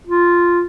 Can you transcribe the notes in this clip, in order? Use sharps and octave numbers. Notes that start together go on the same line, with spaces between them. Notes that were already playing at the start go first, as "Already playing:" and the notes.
F4